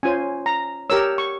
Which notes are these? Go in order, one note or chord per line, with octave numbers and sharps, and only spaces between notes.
C#4 F4 C5 G#5
A#5
G4 A#4 C#5 E6
C#6